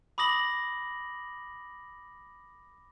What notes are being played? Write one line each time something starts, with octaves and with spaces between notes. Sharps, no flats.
B5 D6 D#6 A#6 F#7